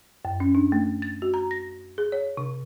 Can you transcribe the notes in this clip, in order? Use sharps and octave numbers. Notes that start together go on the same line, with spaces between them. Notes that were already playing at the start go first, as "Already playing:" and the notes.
F#2
C#4
D4
A3
A6
F#4
A#5
A#6
G#4
C#5
C3